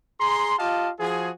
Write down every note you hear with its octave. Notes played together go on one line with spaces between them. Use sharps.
G#4 A#5 C6
F4 G4 D#5 F5 A5
F3 F#4 G#4